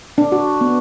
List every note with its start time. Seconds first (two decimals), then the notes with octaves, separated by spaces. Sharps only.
0.18 D4
0.32 F#4
0.61 B3